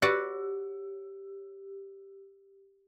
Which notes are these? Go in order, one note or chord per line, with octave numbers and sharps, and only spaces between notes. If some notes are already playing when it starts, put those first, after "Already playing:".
F#4 G4 B4 D5